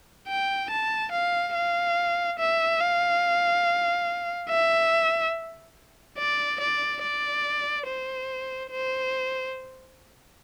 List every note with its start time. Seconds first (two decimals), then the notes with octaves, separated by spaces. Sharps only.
0.28 G5
0.70 A5
1.12 F5
1.55 F5
2.39 E5
2.81 F5
4.49 E5
6.18 D5
6.61 D5
7.03 D5
7.87 C5
8.71 C5